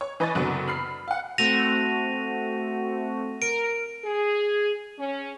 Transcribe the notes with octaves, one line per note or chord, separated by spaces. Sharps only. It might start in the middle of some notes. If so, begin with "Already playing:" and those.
C#5
E3 B4 D#5 G#5 C#6 A6
F#1 C2 D3 F#3 B3
B5 F6 C7
F5 F#5
A3 C4 F#4 A#6 D#7 F7
A#4 D7
G#4
C#4